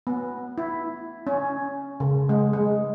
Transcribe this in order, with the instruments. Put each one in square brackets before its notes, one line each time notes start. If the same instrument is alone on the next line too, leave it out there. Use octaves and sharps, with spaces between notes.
[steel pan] B3
E4
C#4
C#3
G#3
G#3